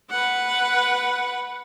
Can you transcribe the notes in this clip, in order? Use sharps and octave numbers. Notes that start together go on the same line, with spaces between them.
B4 F#5